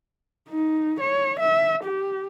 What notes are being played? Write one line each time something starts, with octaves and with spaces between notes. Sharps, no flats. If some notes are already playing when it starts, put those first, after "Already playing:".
D#4
C#5
E5
G4